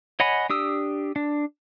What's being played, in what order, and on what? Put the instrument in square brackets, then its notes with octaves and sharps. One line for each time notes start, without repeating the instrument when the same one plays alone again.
[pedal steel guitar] C#5 D#5 F#5 G#5 B5
D4 G4 D#6 E6
D4